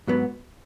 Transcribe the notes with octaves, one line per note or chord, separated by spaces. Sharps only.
G#2 F#3 B3